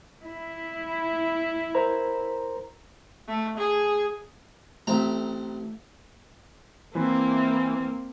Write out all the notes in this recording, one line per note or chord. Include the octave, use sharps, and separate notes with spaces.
E4
A#4 C5 A#5
A3
G#4
A1 A3 C4 E5 A#5
E3 A#3 C4